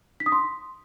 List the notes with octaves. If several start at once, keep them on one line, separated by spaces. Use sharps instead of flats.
B6
D#6
C6